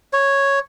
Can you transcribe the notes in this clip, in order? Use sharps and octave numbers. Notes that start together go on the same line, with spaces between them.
C#5